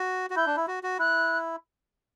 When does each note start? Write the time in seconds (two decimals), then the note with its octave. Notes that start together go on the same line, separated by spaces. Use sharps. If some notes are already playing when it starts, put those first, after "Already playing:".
Already playing: F#4
0.30 F#4
0.36 E4 G6
0.47 D4
0.56 E4
0.68 F#4
0.83 F#4
0.99 E4 F#6